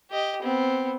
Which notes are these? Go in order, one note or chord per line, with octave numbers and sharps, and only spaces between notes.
G4 D#5
B3 C4